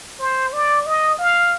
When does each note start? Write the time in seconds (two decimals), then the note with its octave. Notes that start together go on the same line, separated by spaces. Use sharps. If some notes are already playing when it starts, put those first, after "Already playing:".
0.20 C5
0.53 D5
0.86 D#5
1.19 F5